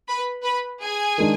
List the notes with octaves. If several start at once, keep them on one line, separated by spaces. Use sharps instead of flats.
B4 B5
B4 B5
G#4 G#5
D#3 G#3 D4